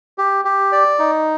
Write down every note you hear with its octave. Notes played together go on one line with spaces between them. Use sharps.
G4
G4
D5
D#4